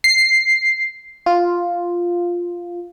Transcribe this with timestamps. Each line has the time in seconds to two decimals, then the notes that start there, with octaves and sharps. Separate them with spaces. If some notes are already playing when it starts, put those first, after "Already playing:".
0.04 C7
1.26 F4